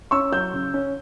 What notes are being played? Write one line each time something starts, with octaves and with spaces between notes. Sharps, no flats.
C#4 C#6 E6
F#3 E6 G6
C#3
C#4